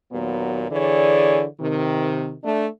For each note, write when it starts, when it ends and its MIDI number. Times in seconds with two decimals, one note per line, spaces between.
0.12 0.65 39
0.12 0.65 46
0.12 0.65 54
0.12 0.65 59
0.71 1.44 50
0.71 1.44 52
0.71 1.44 68
0.71 1.44 73
0.71 1.44 74
1.60 2.35 48
1.60 2.35 51
2.44 2.67 57
2.44 2.67 62